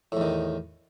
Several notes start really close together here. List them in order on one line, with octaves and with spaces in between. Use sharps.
A2 E2 D#3